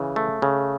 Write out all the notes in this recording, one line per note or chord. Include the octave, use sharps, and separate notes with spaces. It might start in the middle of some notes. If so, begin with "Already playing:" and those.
Already playing: C#3 E3
A3
C#3